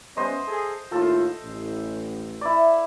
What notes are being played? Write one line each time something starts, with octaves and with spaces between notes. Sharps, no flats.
G3 B3 C#4 C5 D#5
G#4 A4
D#2 A2 F4 A4
A1
E4 D5